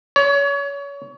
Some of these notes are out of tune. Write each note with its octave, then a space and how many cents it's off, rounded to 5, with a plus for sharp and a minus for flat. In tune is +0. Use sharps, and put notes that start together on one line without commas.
C#5 +30